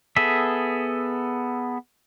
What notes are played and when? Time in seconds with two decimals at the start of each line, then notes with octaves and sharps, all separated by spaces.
0.16 B3 G#4 A4 E5